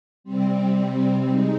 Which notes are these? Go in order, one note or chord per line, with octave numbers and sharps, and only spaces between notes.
C3 G3 C4
G#3 D#4